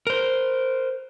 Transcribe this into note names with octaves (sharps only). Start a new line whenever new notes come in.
A#4 C5